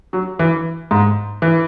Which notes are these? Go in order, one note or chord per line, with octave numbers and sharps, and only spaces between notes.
F#3
E3
G#2
E3